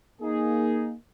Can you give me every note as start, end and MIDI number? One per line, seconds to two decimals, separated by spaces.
0.22 0.93 58
0.22 0.93 63
0.22 0.93 68